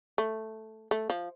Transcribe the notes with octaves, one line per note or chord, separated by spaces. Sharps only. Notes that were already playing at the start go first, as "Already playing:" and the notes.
A3
A3
F3